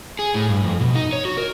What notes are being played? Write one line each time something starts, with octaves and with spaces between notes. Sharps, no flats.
G#4
A2
G2
F2
B2
D#4
C#5
F#4
A#4